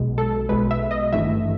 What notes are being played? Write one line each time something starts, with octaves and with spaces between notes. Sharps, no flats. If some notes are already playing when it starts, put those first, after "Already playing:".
Already playing: B1 B2 G#3
A4
B1 B2 G#3 B4
E5
D#5
G#1 G2 E3 A3 E5